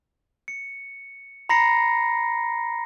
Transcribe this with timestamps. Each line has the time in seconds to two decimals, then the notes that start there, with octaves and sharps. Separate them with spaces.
0.48 C#7
1.49 A#5 B5 A#6 C7 C#7